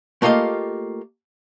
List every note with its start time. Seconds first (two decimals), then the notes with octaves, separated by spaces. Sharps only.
0.22 A3 A#3 F4 G4 D#5